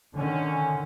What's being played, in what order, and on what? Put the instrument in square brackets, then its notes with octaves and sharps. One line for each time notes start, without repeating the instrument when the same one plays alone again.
[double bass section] D3 D#3 [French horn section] C#4